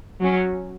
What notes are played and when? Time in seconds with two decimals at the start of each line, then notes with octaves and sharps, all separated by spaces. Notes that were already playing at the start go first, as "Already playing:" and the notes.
0.21 F#3 C#4